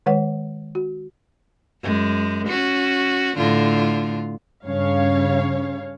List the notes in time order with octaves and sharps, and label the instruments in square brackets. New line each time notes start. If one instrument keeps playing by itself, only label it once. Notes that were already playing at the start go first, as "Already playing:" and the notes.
[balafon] D#3 G#3 B4 C#5 F#5
F#4
[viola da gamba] F#2 G#3
C#4 F#4
A2 D3 F4
[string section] G2 C#3 C#5 F5